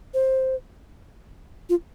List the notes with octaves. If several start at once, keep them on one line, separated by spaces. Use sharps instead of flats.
C5
F4